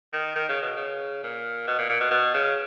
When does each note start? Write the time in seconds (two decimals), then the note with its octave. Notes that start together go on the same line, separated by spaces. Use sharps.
0.13 D#3
0.35 D#3
0.49 C#3
0.62 B2
0.76 C#3
1.23 A#2
1.67 B2
1.78 A#2
1.89 A#2
2.00 B2
2.11 B2
2.34 C#3